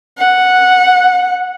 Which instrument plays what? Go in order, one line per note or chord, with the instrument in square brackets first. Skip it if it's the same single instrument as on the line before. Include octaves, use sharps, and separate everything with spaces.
[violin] F#5